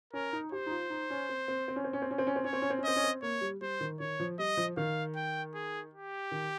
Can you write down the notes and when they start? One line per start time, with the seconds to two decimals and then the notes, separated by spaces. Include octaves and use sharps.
0.13 C#4 A#4
0.33 D#4
0.52 G4 C5
0.66 D#4
0.71 F4
0.90 D#4
1.10 C#4
1.29 C4
1.48 C4
1.68 C4
1.76 C#4
1.84 C4
1.93 C#4
2.02 C4
2.11 C#4
2.18 C4
2.27 C#4
2.36 C4
2.44 C#4 C#5
2.53 C4
2.62 C#4
2.70 C4
2.79 C#4
2.84 C4 D#5
2.96 C#4
3.04 C4
3.22 A#3 C#5
3.41 G3
3.61 G3 C5
3.81 D#3
4.00 D#3 C#5
4.20 F3
4.39 G3 D#5
4.57 F3
4.77 D#3 F5
5.16 G5
5.54 G#4
5.94 G4
6.31 D#3